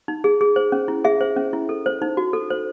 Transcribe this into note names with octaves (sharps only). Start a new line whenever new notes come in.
D#4
G#4
G#4
C5
C#4
E4
G#4 E5
C5
C#4
E4
A4
C5
D#4
F#4
A4
C5